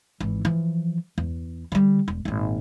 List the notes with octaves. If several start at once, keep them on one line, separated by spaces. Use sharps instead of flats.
G#1 E3
E3 F3
E2
D3 G3
E1
G#1 A#2